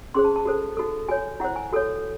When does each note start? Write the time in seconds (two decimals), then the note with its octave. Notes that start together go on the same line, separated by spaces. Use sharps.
0.14 C#4 G#4 C5 C6
0.25 A5
0.36 A5
0.45 F#4 A4 C5
0.77 D#4 F#4 A4
1.08 F#4 C#5 G#5
1.40 E4 C5 F#5
1.56 G#5
1.72 F#4 A4 C#5